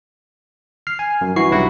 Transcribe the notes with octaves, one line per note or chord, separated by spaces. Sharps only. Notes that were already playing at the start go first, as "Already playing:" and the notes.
F6 C7
G#5
F#2
G2 E3 E4 F#4 C#6 C7
B1 G2 F#3 E4 F#4 F#5